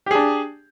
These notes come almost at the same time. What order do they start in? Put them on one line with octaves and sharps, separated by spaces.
G4 G#4 D4